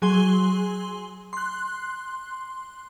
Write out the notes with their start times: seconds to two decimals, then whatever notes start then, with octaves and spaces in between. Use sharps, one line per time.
0.02 F#3 G#4 G#5 C6 G7
1.33 C6 F#6